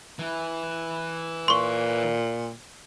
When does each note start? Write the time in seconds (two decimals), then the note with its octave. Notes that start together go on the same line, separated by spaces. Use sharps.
0.19 E3
1.48 A#2 C6 C#6